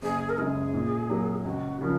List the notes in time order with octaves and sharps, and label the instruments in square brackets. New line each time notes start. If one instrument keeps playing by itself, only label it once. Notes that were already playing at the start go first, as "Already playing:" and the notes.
[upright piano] F#1 [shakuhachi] G#4
[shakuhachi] A#4
[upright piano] F#2 C#3 G#3 [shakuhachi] G#4
[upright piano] A#2
F#3 A#3
[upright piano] C#2 [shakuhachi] F#4
[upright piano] C#3 F3 [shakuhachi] A#4